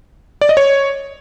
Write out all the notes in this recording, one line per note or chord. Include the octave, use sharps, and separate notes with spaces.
D5
D#5
C#5